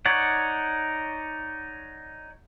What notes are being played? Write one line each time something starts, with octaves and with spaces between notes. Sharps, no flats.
D#4 C#5 D5 F#5